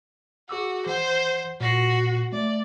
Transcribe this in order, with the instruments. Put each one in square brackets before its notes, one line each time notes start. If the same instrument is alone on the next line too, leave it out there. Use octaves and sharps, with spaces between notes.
[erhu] F#4 [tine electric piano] G#4 D6 E6
[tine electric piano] E3 F#5 [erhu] C5
[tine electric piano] A#2 A#6 C7 [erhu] F#4
[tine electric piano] A3 [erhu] D5